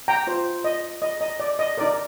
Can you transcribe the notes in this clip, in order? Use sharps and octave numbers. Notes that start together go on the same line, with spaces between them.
G5 A#5
F4 C5
D#5
D#5
D#5
D5
D#5
D#4 A#4 D5